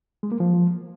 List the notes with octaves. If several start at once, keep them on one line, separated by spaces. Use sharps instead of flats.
G#3
A#3
F3